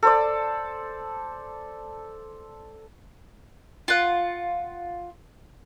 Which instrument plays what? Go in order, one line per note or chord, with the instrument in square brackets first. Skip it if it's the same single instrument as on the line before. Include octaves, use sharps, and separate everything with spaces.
[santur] A4 C5 D5
[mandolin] F4 F#5